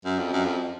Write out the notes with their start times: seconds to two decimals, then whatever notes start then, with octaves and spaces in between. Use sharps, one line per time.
0.05 F#2
0.19 F2
0.33 F#2
0.45 F2